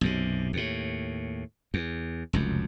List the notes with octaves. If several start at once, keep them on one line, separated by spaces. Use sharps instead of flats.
B1 F#2 C3
D#2 A2
E2
F1 C#2 F#2